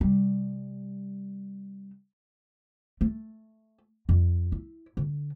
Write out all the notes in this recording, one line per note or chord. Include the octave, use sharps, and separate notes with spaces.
C3 G3
A3
F2
E4
D3